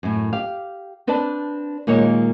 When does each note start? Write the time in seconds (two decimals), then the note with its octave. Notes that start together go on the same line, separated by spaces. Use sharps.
0.03 F#2 A2
0.33 G4 F5
1.07 C4 D4 B4 D5 A5
1.87 A#2 D#3 G#3 A#3 C#5